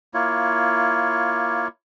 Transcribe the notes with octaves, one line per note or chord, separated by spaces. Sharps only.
A#3 E4 F4 C#5